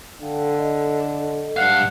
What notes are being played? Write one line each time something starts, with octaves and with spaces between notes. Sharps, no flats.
D3 F5 G5
A4 D#5
G2 G4 B4 D5 F5 F#5